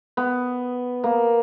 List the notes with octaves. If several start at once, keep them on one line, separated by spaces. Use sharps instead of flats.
B3
A#3